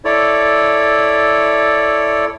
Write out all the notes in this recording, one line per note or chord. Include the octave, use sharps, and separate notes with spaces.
E4 A4 C#5 D5